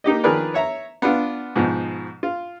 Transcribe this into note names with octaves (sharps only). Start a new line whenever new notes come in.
A#3 D#4 G4 D#5
D#3 F3 G#4 A#4 B4 D5
C#5 E5 A#5
B3 D4 F4
G#2 B2 F3
F4